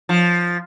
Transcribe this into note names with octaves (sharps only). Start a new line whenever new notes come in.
F3